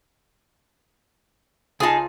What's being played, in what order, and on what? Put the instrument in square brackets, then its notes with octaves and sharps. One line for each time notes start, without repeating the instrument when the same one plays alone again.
[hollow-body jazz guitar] C#2 F4 A5 [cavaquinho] D#4 G#4